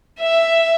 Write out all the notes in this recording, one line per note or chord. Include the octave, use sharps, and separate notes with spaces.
E5